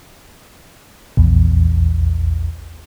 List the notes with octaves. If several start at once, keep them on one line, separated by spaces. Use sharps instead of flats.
A#1 E2